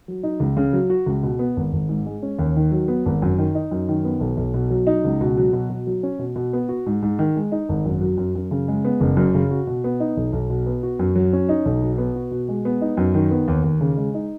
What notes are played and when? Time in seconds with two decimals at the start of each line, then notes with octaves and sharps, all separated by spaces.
0.08 F#3
0.23 D#4
0.40 C#2
0.57 C#3
0.73 F#3
0.90 F#4
1.06 C#2
1.23 B2
1.39 B3
1.57 G#1
1.73 G#1
1.89 G#2
2.06 G#3
2.23 C#4
2.39 D#2
2.56 D#3
2.72 F#3
2.88 B3
3.06 G#1
3.22 F#2
3.38 D#3
3.55 D#4
3.71 F#2
3.89 D#3
4.04 B3
4.21 B1
4.37 B1
4.54 B2
4.70 F#3
4.87 D#4
5.04 C#2
5.21 B2
5.37 F#3
5.53 B2
5.70 B2
5.87 F#3
6.03 C#4
6.19 B2
6.36 B2
6.53 B3
6.69 F#4
6.86 G#2
7.03 G#2
7.19 D#3
7.36 G#3
7.52 D#4
7.69 G#1
7.85 F#2
8.01 F#3
8.18 F#2
8.35 F#2
8.51 C#3
8.68 G#3
8.85 B3
9.01 F#1
9.17 F#2
9.35 C#3
9.51 F#4
9.67 B2
9.84 B3
10.00 D#4
10.17 B1
10.33 B1
10.50 B2
10.66 B3
10.83 F#4
10.99 F#2
11.15 F#3
11.33 C#4
11.49 D#4
11.65 B1
11.82 B2
11.98 B3
12.16 F#4
12.31 B2
12.48 G#3
12.65 B3
12.81 D#4
12.97 F#2
13.14 D#3
13.31 B3
13.48 D#2
13.64 D#2
13.81 C#3
13.97 G#3
14.14 D#4